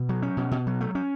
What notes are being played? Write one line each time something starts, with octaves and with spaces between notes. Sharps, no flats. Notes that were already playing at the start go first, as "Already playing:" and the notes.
Already playing: B2
F#3
C#4
B2
B2
F#3
A3
C#4